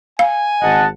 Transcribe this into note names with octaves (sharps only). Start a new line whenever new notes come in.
F5 G#5
G#1 D#5 F#5 A5